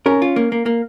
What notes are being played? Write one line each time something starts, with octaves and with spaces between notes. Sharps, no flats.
C#4 A#4
F4
A#3
A#3
A#3